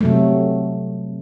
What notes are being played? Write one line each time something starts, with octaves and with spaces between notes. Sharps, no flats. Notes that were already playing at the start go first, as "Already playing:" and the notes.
C3 F#3 A3